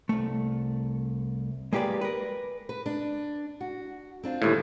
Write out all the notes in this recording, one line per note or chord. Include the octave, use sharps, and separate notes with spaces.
C2 A3
G#3 A#3 G4 B4 D5
A#4 B4
B4
D4
F#4
C4 D4 F4
D#2 A2 D3 G#3 B4